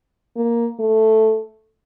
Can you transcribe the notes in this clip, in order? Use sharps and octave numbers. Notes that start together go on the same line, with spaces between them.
A#3
A3